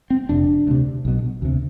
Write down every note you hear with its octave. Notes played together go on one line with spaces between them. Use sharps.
C4
F1 F2 C3 D4
D2 C3
B1 B2
D2 C3